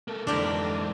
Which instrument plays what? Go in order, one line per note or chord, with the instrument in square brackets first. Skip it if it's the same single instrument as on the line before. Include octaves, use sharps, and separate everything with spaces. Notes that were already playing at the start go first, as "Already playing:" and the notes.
[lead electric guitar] A#3 A4
[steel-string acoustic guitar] F2 D3 [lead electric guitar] G#2 E3 [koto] D4 G4 A#4